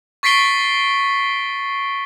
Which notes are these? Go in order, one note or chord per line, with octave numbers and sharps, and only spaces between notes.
C#6 A6 B6 C7 D7 G7